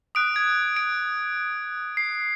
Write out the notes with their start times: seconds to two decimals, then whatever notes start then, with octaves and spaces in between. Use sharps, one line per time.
0.15 D#6 F#6 D7
0.36 G#6
0.76 D7
1.97 C7